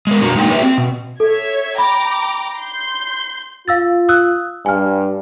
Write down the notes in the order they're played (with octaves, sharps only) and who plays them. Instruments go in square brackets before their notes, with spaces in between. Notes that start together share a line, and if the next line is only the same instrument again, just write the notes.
[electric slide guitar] G#3 B3 A#4
F#2 B2 D4 F#4 A#5
G#3 A#3 D#4 F#4 G5
F#4 G4 B4 D5 E5
C4
B2
[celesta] A4 [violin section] C#5 E5 G#6
[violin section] G5 A#5 D6 [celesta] B5
[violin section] C6 G6
[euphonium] F4 [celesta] F5 E6 A6
[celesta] D#6 E6 F#6
[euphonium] G2 [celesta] G#5 F6